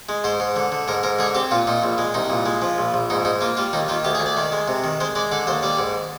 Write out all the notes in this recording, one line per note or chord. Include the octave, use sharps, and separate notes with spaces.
G#3
G#2 C5
G#2
D3
D3
G#2 A#4
G#2 A#4
D3 G#4
C4 G4
A#2 F4
A#2 D#4
A#1
G#3
C2 D#4
A#2
G#3
F3
A#1
A#1
G#2 D#4
G#2 D#4
A#3 F4
G3 F4
D#2 D#4
D#3 F4
D2 G4
G#4
D2
D5
D#3
G#3
C3
D#3
G#3 C5
G#3 D5
D3 D5
D#2 C5
G3 D5
G#2